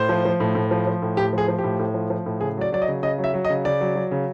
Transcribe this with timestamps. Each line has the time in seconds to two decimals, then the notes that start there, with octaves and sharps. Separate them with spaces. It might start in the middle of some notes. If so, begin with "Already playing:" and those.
Already playing: A2 C5
0.09 F3
0.25 F3
0.40 A2
0.55 A2
0.71 F3
0.87 F3
1.02 A2
1.17 A2 G4
1.33 F3 G#4
1.48 F3
1.59 G4
1.64 A2
1.79 A2
1.94 F3
2.10 F3
2.26 A2
2.41 C#3 G#4
2.57 F#3 D5
2.72 F#3 D5
2.82 D#5
2.88 C#3
3.02 C#3 D#5
3.18 F#3
3.24 E5
3.34 F#3
3.45 D#5
3.50 C#3
3.65 C#3 D5
3.81 F#3
3.95 F#3
4.11 C#3